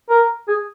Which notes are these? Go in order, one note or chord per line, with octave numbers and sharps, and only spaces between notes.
A#4
G#4